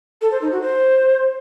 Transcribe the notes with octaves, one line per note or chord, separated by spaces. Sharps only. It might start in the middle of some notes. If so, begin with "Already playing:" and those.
A4
C5
D#4
F#4
C5